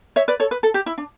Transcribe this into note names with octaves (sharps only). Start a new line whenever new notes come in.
C#5 E5
B4 D5
A4 C#5
B4
A4
G4
E4
D4